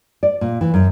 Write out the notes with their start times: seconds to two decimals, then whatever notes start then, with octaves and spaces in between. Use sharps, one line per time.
0.23 D5
0.41 A#2
0.61 E3
0.74 F#2